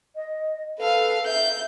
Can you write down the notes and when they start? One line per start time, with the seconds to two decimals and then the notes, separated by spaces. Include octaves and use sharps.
0.16 D#5
0.79 A4 B4 F5
1.26 E5 G6